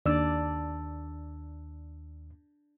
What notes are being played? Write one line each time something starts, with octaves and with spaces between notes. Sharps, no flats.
D#2 D4 D5 E6